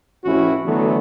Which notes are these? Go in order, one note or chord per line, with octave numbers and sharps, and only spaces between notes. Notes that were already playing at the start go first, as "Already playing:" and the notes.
A1 F2 C#4 E4 F#4
D3 E3 F#3 A3 B3